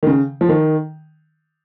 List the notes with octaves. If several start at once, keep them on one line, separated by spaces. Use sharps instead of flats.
D#3
C#3
F3
D#3